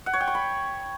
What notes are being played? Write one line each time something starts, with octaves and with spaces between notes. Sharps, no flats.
F#5
C#5
G5
C#6
B5